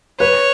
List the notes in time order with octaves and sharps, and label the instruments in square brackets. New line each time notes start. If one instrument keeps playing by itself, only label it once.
[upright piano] B4 [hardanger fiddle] C#5